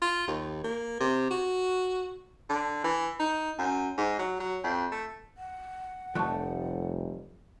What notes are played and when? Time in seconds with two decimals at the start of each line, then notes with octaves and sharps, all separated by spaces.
0.02 F4
0.28 D#2
0.64 A#3
1.00 C3
1.31 F#4
2.50 D3
2.84 E3
3.20 D#4
3.59 F#2
3.98 G#2
4.19 F#3
4.40 F#3
4.64 F2
4.92 A3
5.37 F#5
6.15 F1 F3 G3 A3 A5 C#6 F#6